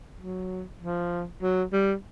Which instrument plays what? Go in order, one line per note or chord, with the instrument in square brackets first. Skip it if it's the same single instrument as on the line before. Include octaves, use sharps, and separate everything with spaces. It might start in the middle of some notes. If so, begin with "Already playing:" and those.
[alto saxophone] F#3
F3
F#3
G3